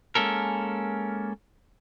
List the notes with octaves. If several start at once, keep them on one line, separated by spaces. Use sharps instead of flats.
G#3 A#3 C#4 A4 A#4